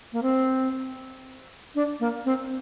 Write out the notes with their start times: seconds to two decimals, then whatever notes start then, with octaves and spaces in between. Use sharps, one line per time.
0.13 A#3
0.23 C4
1.75 D4
2.00 A#3
2.25 C4